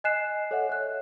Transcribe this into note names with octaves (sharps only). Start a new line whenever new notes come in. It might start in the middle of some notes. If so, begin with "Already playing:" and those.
D#5 G#5 F#6 C7 E7
A4 C#5 D#5 E5 F#5
C#5 F#6